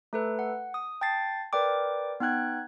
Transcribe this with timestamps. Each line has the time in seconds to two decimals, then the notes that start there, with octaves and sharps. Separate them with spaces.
0.13 A3 A4 B4
0.39 F#5
0.74 D#6
1.01 G5 A5 A6 C7
1.53 A#4 B4 D5 G5 D6
2.20 B3 D#4 G5 F#6 G#6